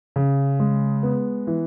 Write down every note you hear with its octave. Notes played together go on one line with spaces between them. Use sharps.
C#3
G#3
B3
E3